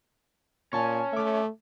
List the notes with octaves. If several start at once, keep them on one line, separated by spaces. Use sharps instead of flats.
A#2 C#4 G#5 A5 C#6
A3 E5 D6